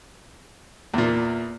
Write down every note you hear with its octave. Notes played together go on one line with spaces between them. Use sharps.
E2 A#2